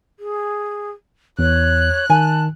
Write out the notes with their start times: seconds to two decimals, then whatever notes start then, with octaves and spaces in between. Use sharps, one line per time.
0.19 G#4
1.39 E2 C#5 F#6
2.10 D#3 G#5 A5